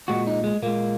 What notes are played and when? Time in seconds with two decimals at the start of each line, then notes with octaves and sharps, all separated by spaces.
0.08 A#2 G#3 F#4
0.27 D#4
0.44 G#3
0.62 A#2 G#3 A#3